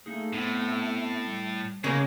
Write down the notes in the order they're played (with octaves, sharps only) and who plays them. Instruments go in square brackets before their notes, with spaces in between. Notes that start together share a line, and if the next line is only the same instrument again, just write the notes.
[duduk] A3 [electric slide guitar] A#3 D#4 G#4
[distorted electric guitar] A2 [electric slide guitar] B3 C4
[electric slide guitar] G3
[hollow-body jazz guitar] C#3 A#3 [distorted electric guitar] G#3 [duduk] C#5